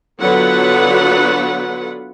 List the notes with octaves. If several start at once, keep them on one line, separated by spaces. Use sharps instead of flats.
D3 F#3 B3 F4 B4 F#5